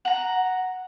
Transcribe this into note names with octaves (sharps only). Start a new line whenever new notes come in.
F#5 A#5